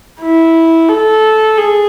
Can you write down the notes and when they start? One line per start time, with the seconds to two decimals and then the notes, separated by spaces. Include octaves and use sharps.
0.20 E4
0.89 A4
1.57 G#4